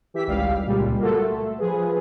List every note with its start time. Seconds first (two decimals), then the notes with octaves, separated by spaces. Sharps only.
0.14 E3 G4 E5 B6
0.28 G#1 C#2 G3 G4 F5
0.67 C#2 A#2 G3 G#3
0.99 A#3 F4 F#4 A4
1.20 A3
1.58 F3 G#4 B4